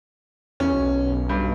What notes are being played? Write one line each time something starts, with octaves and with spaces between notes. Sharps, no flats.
E2 C#4
B1
G2